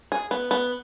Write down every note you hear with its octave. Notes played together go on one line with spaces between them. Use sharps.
G#4
B3
B3